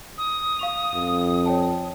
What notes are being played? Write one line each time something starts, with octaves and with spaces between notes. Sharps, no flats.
D#6
F5 C#6 F7
F2
C#5 G5 A5